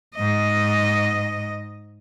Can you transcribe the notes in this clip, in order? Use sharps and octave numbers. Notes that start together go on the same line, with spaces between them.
G#2 D#5